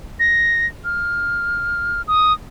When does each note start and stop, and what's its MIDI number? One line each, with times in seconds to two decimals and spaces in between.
0.20 0.66 94
0.85 2.02 89
2.08 2.33 87